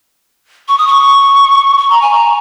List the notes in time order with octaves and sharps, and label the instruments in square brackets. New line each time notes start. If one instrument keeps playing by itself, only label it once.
[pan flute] C#6
D#6
C#6
C#6
A#5
G#5
A#5